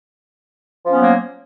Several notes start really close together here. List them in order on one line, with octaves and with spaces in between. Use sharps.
F3 C#4 B3 F#3 A#3